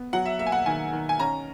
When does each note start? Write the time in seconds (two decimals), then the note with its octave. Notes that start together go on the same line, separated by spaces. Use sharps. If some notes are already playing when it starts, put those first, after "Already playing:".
Already playing: B3
0.13 F#3 F#5
0.26 E5
0.39 A#3 E5
0.46 G#5
0.52 F#5
0.66 D#3 G#5
0.93 D#3
1.09 G#5
1.20 C#4 A#5